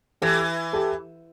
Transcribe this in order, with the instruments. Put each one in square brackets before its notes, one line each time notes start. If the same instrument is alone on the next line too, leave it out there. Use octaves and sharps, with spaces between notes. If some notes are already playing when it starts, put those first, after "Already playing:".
[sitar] E3 [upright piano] G4 A4
[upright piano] G4 A4